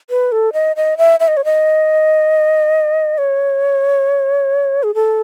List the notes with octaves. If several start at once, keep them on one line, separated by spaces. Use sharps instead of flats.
B4
A4
D#5
D#5
E5
E5
D#5
C#5
D#5
C#5
G#4
A4